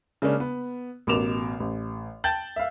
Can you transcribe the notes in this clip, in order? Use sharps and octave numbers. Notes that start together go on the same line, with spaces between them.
C#3 G#3 A#3 C#4 D4
B3
A1 B2 A#4 D6 E7 F7
A1
G5 A5 G6 A6 F#7
E5 F5